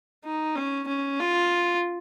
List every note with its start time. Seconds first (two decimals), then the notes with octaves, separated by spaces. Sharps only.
0.25 D#4
0.55 C#4
0.88 C#4
1.20 F4